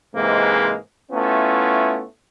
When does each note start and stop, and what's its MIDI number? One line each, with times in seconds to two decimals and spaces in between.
0.15 0.75 44
0.15 0.75 48
0.15 0.75 52
0.15 0.75 56
0.15 0.75 58
1.12 2.03 57
1.12 2.03 59
1.12 2.03 61
1.12 2.03 64
1.12 2.03 65